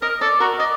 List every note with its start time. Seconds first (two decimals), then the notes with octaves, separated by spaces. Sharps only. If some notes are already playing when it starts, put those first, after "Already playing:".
0.02 A#4 D#5
0.21 A4 D5
0.40 F#4 A#4
0.59 D5 D#5